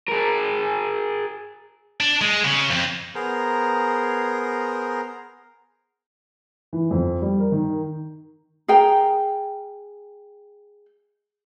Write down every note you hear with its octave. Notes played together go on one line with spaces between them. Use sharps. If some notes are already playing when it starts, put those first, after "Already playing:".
G#4 A#4
D4
G#3
C#3
F2
B3 G#4 A#4 C5 A#5
E3
F2
G3
A#4
D#3
G#4 A#4 G5